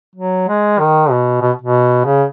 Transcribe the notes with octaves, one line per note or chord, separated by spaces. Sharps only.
F#3
G#3
D#3
B2
B2
B2
C#3